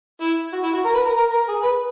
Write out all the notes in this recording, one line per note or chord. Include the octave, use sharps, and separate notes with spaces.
E4
F#4
E4
F#4
A#4
B4
A#4
A#4
A#4
G#4
B4